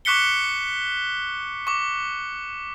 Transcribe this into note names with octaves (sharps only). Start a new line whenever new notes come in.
C#6 D6 F#6 B6 C#7 G7
C#6 D6